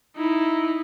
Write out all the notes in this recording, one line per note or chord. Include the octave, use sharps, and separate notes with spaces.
D#4 E4